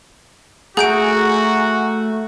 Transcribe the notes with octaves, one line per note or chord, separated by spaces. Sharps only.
A3 F#4 G#4 F#5 G#5 A#5 G6 D7